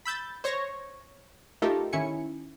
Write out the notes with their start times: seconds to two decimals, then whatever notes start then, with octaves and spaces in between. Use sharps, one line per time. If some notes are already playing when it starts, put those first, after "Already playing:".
0.05 B5 E6 G6 A6
0.44 C5 C#5 C#6 A#6
1.62 A3 D#4 F4 G4 A4 A#4
1.93 D#3 C#4 E4 G#5 C#7